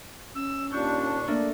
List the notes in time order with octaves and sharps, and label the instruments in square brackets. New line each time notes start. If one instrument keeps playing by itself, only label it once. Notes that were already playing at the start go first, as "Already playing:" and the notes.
[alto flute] C#4 [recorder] E6
[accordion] D#2 A#2 D4 [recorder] C#6 [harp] G6
[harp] A3 A#3 D4 [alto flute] D5